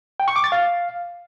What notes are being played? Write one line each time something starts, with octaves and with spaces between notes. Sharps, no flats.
G5
C#6
D6
A6
F5